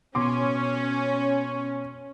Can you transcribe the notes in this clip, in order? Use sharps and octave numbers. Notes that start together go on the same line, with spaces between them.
B2 C#4 C6 D6